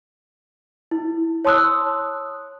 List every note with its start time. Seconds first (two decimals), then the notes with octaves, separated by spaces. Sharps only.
0.91 E4
1.45 C#5 A5 C6 D#6 E6 F#6